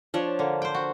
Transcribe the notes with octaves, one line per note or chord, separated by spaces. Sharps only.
F3 D4 C#5
D3 A#3
C5 G5
F#4